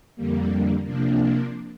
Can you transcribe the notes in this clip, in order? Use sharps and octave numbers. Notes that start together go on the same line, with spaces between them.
F2 D3 G3 A#3
C3 F3 A#3 D4